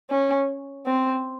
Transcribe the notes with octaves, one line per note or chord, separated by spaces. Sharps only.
C#4
C4